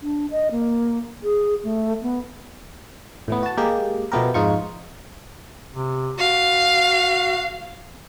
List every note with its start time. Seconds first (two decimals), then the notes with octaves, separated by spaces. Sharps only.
0.01 D4
0.31 D#5
0.51 A#3
1.23 G#4
1.64 A3
2.02 B3
3.28 A2 E3 B3
3.43 F#4 A5
3.57 G#3 A#3 G4 G#4
4.12 B2 F3 A3 B3 G4 A#4
4.34 F2 G#2 D#4 F4 C#6
5.74 C3
6.19 F#4 F5